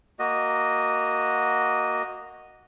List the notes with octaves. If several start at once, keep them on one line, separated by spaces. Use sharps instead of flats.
A#3 F#4 D#5